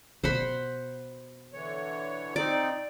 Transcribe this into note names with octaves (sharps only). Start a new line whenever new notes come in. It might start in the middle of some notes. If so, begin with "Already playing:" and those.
B2 C5 F#5 B5
D3 E3 C#5
C4 D#4 D5